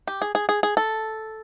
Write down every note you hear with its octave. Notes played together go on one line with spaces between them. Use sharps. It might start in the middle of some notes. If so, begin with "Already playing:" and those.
G4
G#4
G#4
G#4
G#4
A4